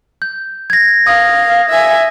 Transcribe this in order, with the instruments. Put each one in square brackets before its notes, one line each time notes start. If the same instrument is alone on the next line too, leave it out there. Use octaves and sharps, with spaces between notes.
[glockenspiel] G6
G#6 A#6
[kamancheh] F5 [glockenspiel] D#6
[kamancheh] E5 G#5